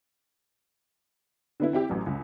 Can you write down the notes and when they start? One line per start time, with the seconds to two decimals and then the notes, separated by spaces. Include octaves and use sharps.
1.60 D3 B3 E4
1.73 C4 E4 G4
1.90 A1 F#3
2.06 C#2